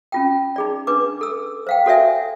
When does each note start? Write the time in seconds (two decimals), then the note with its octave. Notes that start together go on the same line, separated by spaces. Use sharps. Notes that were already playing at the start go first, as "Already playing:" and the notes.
0.12 C#4 F4 G5
0.56 D#4 G#4 D5
0.87 D4 B4 D6
1.21 A4 E6
1.67 C5 F5 G5
1.86 F#4 A4 C#5 D5 E5 G#5